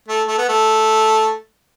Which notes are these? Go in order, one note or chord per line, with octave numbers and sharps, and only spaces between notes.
A3
A3
B3
A3